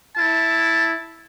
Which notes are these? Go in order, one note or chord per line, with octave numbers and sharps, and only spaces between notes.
E4 A5